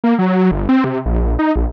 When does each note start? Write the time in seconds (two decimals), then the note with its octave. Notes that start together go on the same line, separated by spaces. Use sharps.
0.04 A#3
0.19 F#3
0.51 G1
0.69 C4
0.84 C3
1.06 A#1
1.39 D#4
1.56 A#1